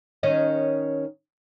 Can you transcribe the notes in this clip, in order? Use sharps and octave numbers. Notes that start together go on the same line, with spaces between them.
D#3 C#4 D#5